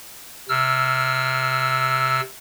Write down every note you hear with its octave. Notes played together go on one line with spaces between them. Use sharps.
C3 E6 F6